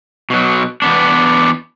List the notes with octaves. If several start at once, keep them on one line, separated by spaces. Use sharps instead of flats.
B2 F#3
E2 B3 D4